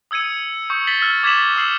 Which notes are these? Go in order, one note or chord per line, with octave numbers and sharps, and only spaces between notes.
D#6 E6 G#6 C#7 D#7
C#6 D#6 G6 C#7
A6 B6 F#7 G7
E6 F6
D6 G#6 A6 B6 E7 F#7
D#6 E6 C7 F#7 G7